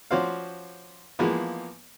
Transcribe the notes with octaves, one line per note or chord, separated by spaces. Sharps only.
F3 C#4 F#4 C5 D5 F5
E3 F3 G#3 A#3 B3